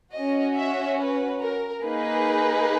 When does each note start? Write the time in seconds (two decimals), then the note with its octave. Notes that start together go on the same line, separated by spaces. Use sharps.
0.14 C#4 F#4 D#5
0.56 E5
0.99 B4
1.41 A#4
1.83 A#3 D#4 G#4 B4